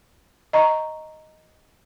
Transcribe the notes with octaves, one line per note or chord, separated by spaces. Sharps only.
D#5 A#5 C#6